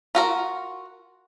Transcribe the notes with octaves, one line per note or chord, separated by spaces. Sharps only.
F4 F#4 A#4